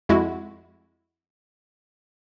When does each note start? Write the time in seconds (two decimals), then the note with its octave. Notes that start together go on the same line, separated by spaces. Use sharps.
0.09 F2 G#3 E4 F#4